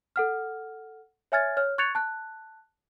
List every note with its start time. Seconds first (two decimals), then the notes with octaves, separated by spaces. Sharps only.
0.16 A4 F#5 F6
1.32 C#5 E5 G#5 F6 G#6 A6
1.57 C#5 F6
1.78 C#6 F#6 G#6 A6 C#7 F7
1.95 A5 F#6